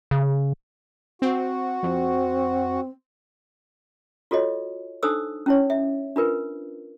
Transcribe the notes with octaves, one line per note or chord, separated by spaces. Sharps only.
C#3
C4 F#4
F2 C4
F4 F#4 A4 C#5 D#5
D4 D#4 A4 C5 D#6 E6
C#4 E4 C#5
E5
D4 F4 A#4 B4